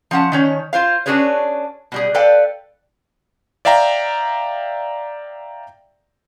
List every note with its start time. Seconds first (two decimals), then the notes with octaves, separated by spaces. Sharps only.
0.11 F3 C#4 F#5 A5
0.32 D#3 C#4 C#5
0.73 F4 C5 F5
1.06 C#4 D4 F#4 G#4 B4 C#5
1.92 B2 G3 G#4
2.15 A4 B4 D5 F5 G5
3.65 D5 E5 F5 G5 A#5